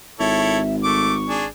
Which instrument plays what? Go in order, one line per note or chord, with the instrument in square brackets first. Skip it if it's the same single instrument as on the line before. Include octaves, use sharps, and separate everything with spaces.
[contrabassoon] G#1 [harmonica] E4 A4 C#5 [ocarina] E5
[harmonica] A3 D6 [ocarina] C#6
[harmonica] D4 G#4